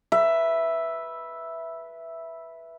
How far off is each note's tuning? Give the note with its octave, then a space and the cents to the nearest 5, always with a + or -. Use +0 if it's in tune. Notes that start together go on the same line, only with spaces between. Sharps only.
B4 -10 E5 +0